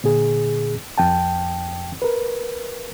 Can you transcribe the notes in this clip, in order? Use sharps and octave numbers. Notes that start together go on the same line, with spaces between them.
A#2 D3 G#4
F2 G5 A5
A#4 B4